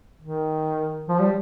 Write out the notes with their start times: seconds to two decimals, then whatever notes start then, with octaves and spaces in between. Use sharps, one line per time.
0.21 D#3
1.09 F3
1.19 G3